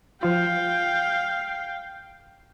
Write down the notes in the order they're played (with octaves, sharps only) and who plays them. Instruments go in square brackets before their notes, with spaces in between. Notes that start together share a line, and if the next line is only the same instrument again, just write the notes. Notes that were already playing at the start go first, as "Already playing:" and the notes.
[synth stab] F3 F4 [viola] F5 G5